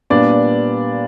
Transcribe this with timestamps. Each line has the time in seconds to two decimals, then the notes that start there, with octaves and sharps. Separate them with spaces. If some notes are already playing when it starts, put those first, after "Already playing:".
0.10 A#2 G3 B3 D4 D5